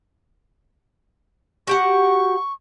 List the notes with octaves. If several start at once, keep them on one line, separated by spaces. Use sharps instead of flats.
F#4 G4 F#5 C#6